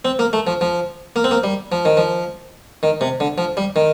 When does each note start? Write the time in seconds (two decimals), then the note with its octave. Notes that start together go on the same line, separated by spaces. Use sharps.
0.05 C4
0.19 A#3
0.33 A3
0.47 F3
0.61 F3
1.16 A#3
1.24 C4
1.31 A#3
1.44 G3
1.72 F3
1.85 D#3
1.97 F3
2.83 D#3
3.01 C3
3.20 D3
3.38 F3
3.57 G3
3.76 D#3